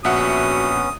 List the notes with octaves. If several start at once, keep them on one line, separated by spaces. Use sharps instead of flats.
A#1 B3 C#4 F#4 E5 F#5 D#6